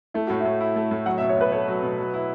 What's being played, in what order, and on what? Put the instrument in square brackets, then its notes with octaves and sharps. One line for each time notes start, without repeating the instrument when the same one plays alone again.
[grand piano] A3 [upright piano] E4
[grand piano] A2 [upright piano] F#4
[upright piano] E4
[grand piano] A2
E4
A3
A2
[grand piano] F#3 [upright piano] F#5
[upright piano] E5
[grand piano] B2
[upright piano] C#5
[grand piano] B2 [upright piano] B4
[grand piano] A3 [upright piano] C#5
[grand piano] F#3
B2
F#3
E4